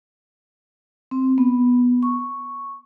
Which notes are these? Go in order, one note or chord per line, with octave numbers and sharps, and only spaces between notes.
C4
B3
C#6